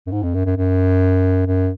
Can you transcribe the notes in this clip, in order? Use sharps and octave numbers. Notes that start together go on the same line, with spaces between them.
F#2
G#2
F2
F#2
F#2
F#2
F#2